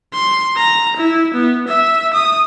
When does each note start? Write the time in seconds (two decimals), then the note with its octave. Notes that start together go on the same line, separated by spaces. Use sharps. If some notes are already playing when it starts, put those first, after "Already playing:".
0.14 C6
0.57 A#5
0.97 E4
1.34 B3
1.68 E5
2.14 D#6